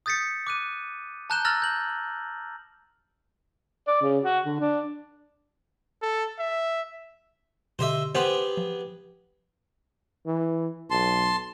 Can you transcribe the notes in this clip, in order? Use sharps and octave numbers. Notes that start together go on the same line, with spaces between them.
D#6 G6 A6 B6 C#7
D6 F#6 D#7
A5 A#5 F#6 G6 E7 G7
A#5 E6 F6 A6 A#6 F#7
G6 F#7
D5
C#3
F#4
D3
D4
A4
E5
B2 D3 G4 C5 D#5 E5
B3 G4 G#4 C5 C6
F3
E3
B1 A5 C6